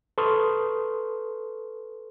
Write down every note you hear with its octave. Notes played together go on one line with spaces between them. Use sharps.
A4 B4 C6 C#6 D#6 F6